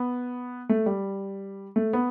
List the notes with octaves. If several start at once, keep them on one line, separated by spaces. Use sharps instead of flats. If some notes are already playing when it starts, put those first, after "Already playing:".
Already playing: B3
A3
G3
A3
B3